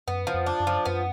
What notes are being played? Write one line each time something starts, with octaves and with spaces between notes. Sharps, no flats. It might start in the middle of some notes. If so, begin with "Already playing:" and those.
F#2 B3
F3
F2
D4
F#2
F3
F#2 B3